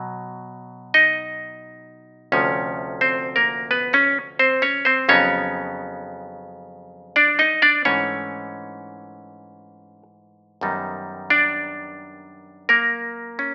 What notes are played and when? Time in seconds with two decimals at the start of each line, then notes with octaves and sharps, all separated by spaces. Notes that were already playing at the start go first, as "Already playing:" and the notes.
Already playing: B2 F#3
0.94 D#4 D#5
2.32 D2 C3 F3 A3 C#4 C#5
3.01 C4 C5
3.36 A#3 A#4
3.71 B3 B4
3.93 C#4 C#5
4.39 C4 C5
4.62 C#4 C#5
4.85 C4 C5
5.09 F2 C#3 F#3 B3 C#4 D#4 C#5
7.16 D4 D5
7.39 D#4 D#5
7.62 D4 D5
7.85 G#2 E3 A3 C#4 D4 C#5
10.61 F#2 D#3 G3 B3 D#4
11.30 D4 D5
12.69 A#3 A#4
13.39 C#4